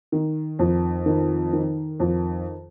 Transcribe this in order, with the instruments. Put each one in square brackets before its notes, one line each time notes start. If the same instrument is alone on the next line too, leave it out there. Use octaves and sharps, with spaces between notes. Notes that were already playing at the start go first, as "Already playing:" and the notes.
[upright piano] D#3
F2
D#3
D#3
F2